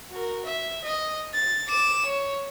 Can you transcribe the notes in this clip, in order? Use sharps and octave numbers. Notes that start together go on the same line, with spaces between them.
F#4 A#4
E5
D#5
A6
D6 E7
C#5